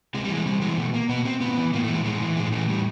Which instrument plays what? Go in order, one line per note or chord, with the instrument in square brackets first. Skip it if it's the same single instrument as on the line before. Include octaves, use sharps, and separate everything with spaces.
[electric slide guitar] C3 G#3
G3
E3
G#3
C3 G3
E3 G#3
B2 A3
A#3
B2 B3
C4
A2 B3
E3
A2 A#3
A3
E3 G#3
A2 G#3
E3
A2 G#3
E3 A3
A2 G3